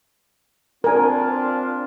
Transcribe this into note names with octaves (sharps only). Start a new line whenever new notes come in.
C4 D4 F4 A#4 G#5